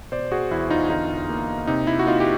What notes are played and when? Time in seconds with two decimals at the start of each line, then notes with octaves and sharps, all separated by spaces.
0.12 B2 C5 D5
0.32 F#4 G#4
0.51 E2 E4
0.70 D#4 F4
0.90 D3 D#4 F4
1.30 A#3
1.67 C3 D#4
1.87 E4
1.99 F#4
2.07 A#3 D#4 F4
2.20 G4